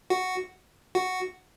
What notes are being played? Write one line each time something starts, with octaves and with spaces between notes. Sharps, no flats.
F#4
F#4